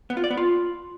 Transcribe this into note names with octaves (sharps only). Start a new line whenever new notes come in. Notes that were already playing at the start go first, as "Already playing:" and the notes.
B3
F4
D5
B3
F4